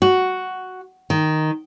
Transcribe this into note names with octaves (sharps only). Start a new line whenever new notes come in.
F#4
D#3